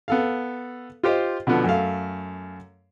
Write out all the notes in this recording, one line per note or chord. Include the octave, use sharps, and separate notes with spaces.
B3 A4 F5
F4 G4 C5 D#5
B2 D3 F3 B3
F#2 A3 F5